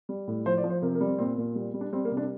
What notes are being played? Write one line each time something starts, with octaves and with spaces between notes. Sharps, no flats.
G3
A2
F3 C5
D5
F3
C5
C3 A#4
A#4
G3
C4
A#2 C4
A#2
G3
G3
D4
G3 C4
A#3
C3
D4